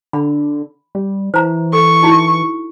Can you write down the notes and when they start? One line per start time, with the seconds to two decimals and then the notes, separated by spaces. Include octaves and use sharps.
0.13 D3 B5
0.95 G3
1.34 E3 C5 A#5
1.73 A4 C#6
2.02 D#4 E4 F#4